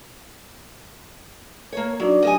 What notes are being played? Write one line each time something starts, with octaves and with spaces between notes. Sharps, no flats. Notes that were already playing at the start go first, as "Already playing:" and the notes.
A#3 C#5
F#3 D4 D#4 D5
F#3 G4 D#5 E5 G#5 D#6